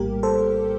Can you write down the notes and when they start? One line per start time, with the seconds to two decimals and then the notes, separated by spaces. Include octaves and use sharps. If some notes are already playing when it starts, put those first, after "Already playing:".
Already playing: A#1 A2 G3 A#3 G4 A#4
0.23 A4 C5